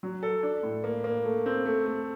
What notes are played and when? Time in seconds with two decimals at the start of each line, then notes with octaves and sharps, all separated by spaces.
0.03 F#3
0.23 A4
0.43 D4
0.63 A2
0.84 A#3
1.04 A#3
1.25 A3
1.46 C4
1.65 A3
1.86 A3